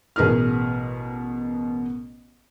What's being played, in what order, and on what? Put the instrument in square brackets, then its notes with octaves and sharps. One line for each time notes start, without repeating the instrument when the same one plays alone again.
[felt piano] A1 B2 G#4 A#4 B4 F6